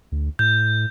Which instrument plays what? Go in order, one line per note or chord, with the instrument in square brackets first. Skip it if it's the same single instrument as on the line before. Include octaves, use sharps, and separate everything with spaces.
[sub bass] D2
[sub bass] A2 [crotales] G6